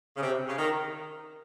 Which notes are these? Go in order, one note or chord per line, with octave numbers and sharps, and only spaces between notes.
C#3
C3
C#3
D#3